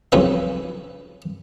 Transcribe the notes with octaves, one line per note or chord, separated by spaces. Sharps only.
B1 F2 C#3 B4 E5